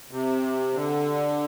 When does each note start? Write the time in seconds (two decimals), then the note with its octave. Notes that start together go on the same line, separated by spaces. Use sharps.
0.11 C3
0.74 D3